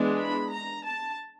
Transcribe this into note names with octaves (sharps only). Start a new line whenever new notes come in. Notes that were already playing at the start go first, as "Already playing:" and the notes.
Already playing: E3 G#3 B3 D4
B5
A#5
A5